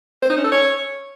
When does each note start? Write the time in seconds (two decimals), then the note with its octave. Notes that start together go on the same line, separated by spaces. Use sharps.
0.22 C5
0.30 D#4
0.37 C#4
0.44 A4
0.52 C#5